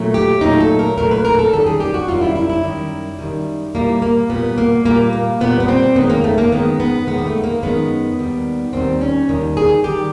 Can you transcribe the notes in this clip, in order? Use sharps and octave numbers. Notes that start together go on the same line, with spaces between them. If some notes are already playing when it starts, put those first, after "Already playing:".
Already playing: A#2 F#3 A3
G4
A#2 F#3 A3 D#4
A4
A#4
A#2 F#3 A3 A#4
B4
A#4
A4
F#2 D#3 G3 A4
G#4
G4
F#4
F#2 D#3 G3 F4
E4
E4
E4
F#2 D#3 G3
F#2 D#3 G3
A#2 G3 A#3
A#3
A#2 G3 B3
A#3
A#2 G3 A#3
A#3
A#2 G3 B3
B3
C4
F#2 D#3 G#3 B3
A#3
A3
A#3
F#2 D#3 G#3 B3
B3
F#2 D#3 G#3 B3
A#3
A3
A#3
F#2 D#3 G#3 B3
D#2 D#3 G3
D#2 D#3 G3 C4
C#4
D#2 D#3 G3
G#4
D#3 G3 G4